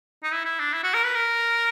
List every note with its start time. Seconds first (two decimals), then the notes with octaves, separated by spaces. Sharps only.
0.23 D#4
0.32 E4
0.45 E4
0.59 D4
0.73 E4
0.84 F#4
0.94 A#4
1.04 B4
1.15 A#4